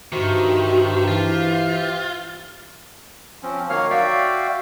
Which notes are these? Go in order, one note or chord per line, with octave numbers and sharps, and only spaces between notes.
G2 D#3 F#4 G4 C5 E5
E3 F4
F3 C4 C#4
D#3 F#3 A#3 C#5 F5 F6
F#4 D5 E5 F5 G5